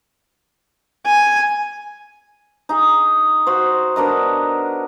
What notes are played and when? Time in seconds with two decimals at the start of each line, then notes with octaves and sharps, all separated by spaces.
1.06 G#5
2.69 D#4 G#4
3.47 F#4 C5
3.96 B3 D4 A#4 D#5